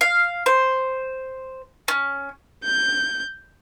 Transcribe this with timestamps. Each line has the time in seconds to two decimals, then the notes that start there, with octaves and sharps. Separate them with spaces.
0.01 F5
0.46 C5
1.88 C#4
2.65 G6